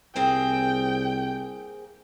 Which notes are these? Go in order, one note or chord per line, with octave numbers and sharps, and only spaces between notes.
C2 A#3 C4 G#4 G5